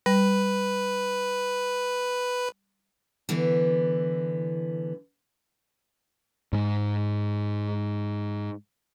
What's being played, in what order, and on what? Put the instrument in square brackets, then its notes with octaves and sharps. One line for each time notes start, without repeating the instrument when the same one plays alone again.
[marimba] G3 [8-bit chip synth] B4
[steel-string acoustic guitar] D3 E3 B3
[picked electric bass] G#2 G#3